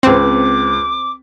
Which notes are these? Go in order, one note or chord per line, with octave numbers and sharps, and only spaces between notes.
C#2 C4 B4 D6